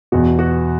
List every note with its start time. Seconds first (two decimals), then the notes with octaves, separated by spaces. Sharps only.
0.12 E2 B2 F#4
0.39 F#4